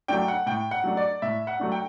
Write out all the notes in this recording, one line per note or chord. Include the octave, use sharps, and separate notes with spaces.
F#3 A3 D4 G5
F#5
A2 G5
F#5
F#3 A3 D4
D5
A2 E5
F#5
F#3 A3 D4
G5